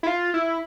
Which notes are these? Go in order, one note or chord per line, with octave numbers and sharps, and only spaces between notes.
E4
F4
E4